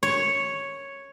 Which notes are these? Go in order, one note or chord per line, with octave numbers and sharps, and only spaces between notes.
C#5